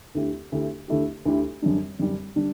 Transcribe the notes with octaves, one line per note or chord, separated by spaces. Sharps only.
D2 D3 A3 E4 G4
D2 D3 A3 E4 G4
D2 D3 A3 E4 G4
D2 D3 A3 E4 G4
F#2 D3 G3 D4
F#2 D3 G3 D4
D3 G3 D4